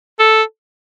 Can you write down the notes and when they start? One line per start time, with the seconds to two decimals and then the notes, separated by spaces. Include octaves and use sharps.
0.20 A4